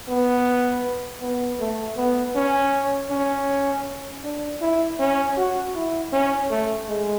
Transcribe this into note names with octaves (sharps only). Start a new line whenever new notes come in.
B3
B3
A3
B3
C#4
C#4
D4
E4
C#4
F#4
E4
C#4
A3
G#3